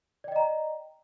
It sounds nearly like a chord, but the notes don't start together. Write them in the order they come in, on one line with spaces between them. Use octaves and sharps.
D5 G5 D#5 A#5